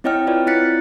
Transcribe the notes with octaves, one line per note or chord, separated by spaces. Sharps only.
C4 E4 C#5 D#5 G5 F6
F4 B4 C#5 D5
C4 E4 F#6 A6 B6 C#7